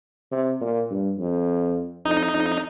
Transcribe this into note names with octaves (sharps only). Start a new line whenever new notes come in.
C3
A#2
G2
F2
F2 D#4
F2